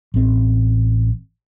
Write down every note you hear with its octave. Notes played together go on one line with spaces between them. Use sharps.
A1 C4